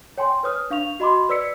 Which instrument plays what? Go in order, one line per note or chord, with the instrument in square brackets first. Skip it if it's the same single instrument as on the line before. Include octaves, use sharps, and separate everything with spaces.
[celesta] C#5 G5 G#5 C6
B4 C#5 D#6 F6
D4 F5 C#6 F7
F#4 D#5 B5 C6 D6
B4 D5 E6 B6 C#7